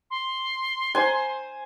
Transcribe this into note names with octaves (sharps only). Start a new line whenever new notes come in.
C6
C5 G#5